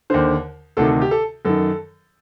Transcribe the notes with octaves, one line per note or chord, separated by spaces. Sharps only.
D#2 D3 C5
D2 C3 D#3 A4
G4
A4
F#2 D#3 A4